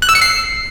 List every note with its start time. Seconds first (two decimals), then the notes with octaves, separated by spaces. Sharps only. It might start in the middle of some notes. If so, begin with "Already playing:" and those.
0.02 F#6
0.09 E6
0.15 C#7
0.22 C7